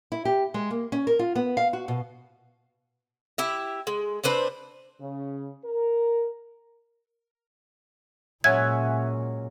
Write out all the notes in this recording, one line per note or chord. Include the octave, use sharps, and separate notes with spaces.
E4
G4
G#3
A#3
C#4
A#4
F4
B3
F5
F#4
B2
E4 G4 E5
G#3
C4 D4 B4 C5
C#3
A#4
A#2 F#3 G#3 C#4 E5 F#5 G#5 G#6